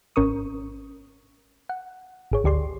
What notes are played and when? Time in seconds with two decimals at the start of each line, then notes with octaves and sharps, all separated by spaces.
0.16 G#1 C#4 A#4 C#6 D#6
1.69 F#5
2.32 G#1 G#4 C#5
2.44 D2 G4 D5 C6